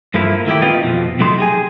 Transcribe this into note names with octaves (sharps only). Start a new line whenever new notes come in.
G2 F3 A3 A#3 E4
D#3 A3 E4 G4
C4 F4 B4 D#5 F5 G5
F2 B2 F3
C3 F#3 A3 D#4 C6
G4 G#4 G#5